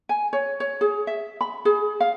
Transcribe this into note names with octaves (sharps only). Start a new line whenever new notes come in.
G#5
C#5
C#5
G#4
E5
B5
G#4
F5